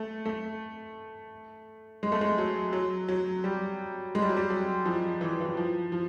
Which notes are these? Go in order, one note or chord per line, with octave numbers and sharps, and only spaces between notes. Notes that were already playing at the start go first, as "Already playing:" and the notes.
Already playing: A3
A3
G#3
A3
G#3
F#3
F#3
F#3
G3
G#3
G3
F#3
G3
F#3
F3
E3
E3
F3
F3